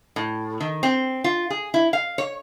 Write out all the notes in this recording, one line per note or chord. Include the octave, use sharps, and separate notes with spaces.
A2
D#3
C4
F4
G#4
E4
F5
C#5